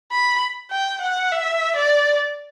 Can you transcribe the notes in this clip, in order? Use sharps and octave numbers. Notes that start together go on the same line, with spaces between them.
B5
G5
F#5
E5
D5